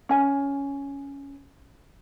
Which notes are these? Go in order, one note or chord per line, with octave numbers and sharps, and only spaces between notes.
C#4 G#5